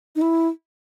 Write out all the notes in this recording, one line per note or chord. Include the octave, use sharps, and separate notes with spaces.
D#4
E4